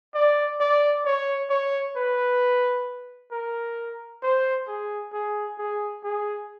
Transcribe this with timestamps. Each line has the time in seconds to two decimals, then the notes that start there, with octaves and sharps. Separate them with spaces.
0.14 D5
0.60 D5
1.06 C#5
1.50 C#5
1.96 B4
3.31 A#4
4.23 C5
4.68 G#4
5.13 G#4
5.58 G#4
6.04 G#4